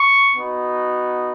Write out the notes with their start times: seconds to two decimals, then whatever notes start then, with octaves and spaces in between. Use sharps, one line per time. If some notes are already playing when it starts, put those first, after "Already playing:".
Already playing: C#6
0.36 B3 D#4 F#4